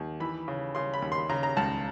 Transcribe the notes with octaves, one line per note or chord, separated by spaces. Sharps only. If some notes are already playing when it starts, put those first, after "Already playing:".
Already playing: D#2
E3 B5
C#3
C#3 C6
B5
D#2
C6
C#3 A#5
A#5
C#2 A5